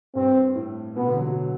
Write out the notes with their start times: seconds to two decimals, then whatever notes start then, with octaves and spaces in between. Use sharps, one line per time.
0.15 G2 C4
0.55 A2
0.96 B2 B3
1.06 D3
1.16 F#3
1.27 F#3